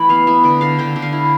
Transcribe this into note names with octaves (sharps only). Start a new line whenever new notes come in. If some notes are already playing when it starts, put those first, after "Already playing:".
Already playing: E3 A3 B5 D6
B3 F5
B3 E5
D3 D5
D3 F5
D3 G5
D3
F5
E4